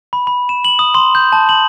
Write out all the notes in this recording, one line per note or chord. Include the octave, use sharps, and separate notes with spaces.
B5
B5
E7
F#7
D#6
C6
G6
A5
F#7